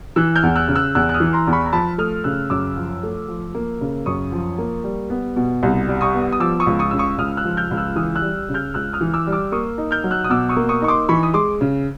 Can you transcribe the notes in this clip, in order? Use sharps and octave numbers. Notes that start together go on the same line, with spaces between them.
E3 E6 F#6
F6 G6
E2
E6 F#6
C#3
E6 F#6
E2 E6 F#6
F#6
D#6 F6
E3
A#5 C6
E2
B5 C#6
A#5
F3 A5 B5
A3 D#6 F6
C#3 E6 F#6
F#2 D6 E6
F3
A3
F3
A#3
C#3
F#2 C#6 D#6
F3
A#3
G3
B3
B2
C2
G3
C#6 D#6
B3
D#6
F3 D6 E6
C#6 D#6
C#2
C#6 D#6
C#3 E6
C#6 D#6
C#2 D#6 F6
E6 F#6
F3
F6 G6
C#2
E6 F#6
E3 D#6 F6
E6 F#6
G3
C#3
F6 G6
C#2 E6 F#6
D#6 F6
E3
D6 E6
G3
D6 E6
A#3 C#6 D#6
D#4
F6 G6
F#3
E6 F#6
D#6
B2 D6 E6
C#6 D#6
A#3
C#6 D#6
D#4 C#6
C6 D6
E3 B5 C#6
D#6
G#3 C6 D6
C#3